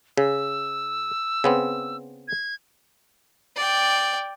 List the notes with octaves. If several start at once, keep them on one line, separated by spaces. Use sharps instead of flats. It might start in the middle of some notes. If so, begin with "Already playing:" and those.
C#3 E6
C#3 B3 C4
G#6
D5 G5